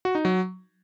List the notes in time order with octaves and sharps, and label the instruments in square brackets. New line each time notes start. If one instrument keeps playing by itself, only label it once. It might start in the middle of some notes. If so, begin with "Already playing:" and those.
[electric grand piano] F#4
D#4
F#3